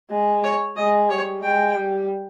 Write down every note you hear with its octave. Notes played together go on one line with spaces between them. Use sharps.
G#3
C#5
G#3 D#5
G3 C#5
G#3 G5
G3